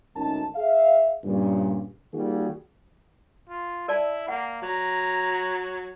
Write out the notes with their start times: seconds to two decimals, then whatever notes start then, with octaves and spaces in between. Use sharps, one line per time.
0.15 G#1 D2 C#4 D#4 A#4 A5
0.56 G#4 E5 F5
1.24 G2 A#2 C#3
2.13 D#3 G3 A#3 F4 F#4 G#4
3.49 F4
3.88 E4 A#4 D5 A5
4.28 A#3 F#5
4.63 F#3 A#5